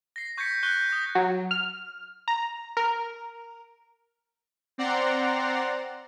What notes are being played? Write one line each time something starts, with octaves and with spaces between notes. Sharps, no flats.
A#6 C7
C#6 G6 G#6 A#6 B6 C#7
C#6 F#6 G6 G7
D#6 A#6
F#3
F6
A#5
A#4
C4 D5 F#5 A#5 C6